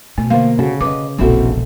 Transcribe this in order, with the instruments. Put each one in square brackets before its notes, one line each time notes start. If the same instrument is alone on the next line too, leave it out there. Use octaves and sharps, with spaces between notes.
[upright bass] B2 [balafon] A3
[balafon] D3 F5 [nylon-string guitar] A#3
[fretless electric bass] C#3 [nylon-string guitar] F#4 A4
[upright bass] C#4 [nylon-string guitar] B4 D#5 [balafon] D6
[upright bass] E1 A#1 [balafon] A#3 A4 [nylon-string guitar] C4 E4 F#4